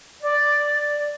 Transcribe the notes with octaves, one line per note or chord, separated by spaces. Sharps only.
D5